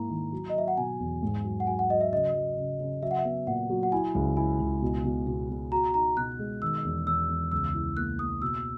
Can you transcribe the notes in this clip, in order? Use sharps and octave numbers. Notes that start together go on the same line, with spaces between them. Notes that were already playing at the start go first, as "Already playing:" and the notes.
Already playing: G#2 A#3 E4 A#5
D#3
F#3
D#5
F#3 E5
F#5
B2 G#5
E2
G#2
F#3
F#5
F#3 G#5
F#5
F#3 D#5
E5
C#3 D#5
F#3
C#3
C#3
F#3 E5
F#5
E5
B3
A#2 F#5
F#3
F#5
E4 G#5
C#2 G#5
E4 G#5
C#2
B2
B2
B2
B2
F#4 A#5
D#4 A#5
B2 F#6
G#3
D#3 E6
E2
E2 E6
E2
C#2 E6
E4
A#3 F#6
A#3 D#6
B2 E6